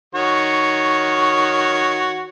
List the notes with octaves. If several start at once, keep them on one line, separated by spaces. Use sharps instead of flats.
D#3 F#4 C#5